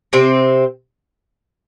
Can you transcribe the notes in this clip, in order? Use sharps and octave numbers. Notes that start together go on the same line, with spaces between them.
C3 C4